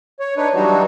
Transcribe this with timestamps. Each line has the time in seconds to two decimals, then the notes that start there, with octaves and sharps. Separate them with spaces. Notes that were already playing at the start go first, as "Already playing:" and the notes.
0.20 C#5
0.37 D4 D#4 B4 C#5
0.55 E3 F#3 G3 D4 D#4 F#4